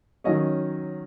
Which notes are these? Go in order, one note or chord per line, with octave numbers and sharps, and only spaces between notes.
D#3 F#3 C#4 D#5